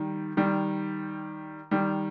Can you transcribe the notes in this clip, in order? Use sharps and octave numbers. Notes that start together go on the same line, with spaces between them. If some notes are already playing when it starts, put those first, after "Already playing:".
Already playing: D#3 G3
D#3 G3
D#3 G3